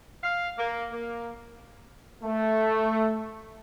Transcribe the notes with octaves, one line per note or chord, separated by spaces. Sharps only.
F5
A#3
A#3
A3